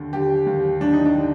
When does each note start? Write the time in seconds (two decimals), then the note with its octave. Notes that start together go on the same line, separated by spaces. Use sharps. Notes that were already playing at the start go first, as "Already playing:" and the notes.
Already playing: D#2 D3
0.13 D3 G4
0.46 D#2
0.81 D#2 D4
0.93 D#4
1.05 D4
1.16 D3